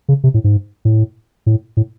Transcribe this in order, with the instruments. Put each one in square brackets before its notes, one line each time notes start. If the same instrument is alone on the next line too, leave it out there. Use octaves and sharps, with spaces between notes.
[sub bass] C#3
C3
A2
G#2
A2
A2
A2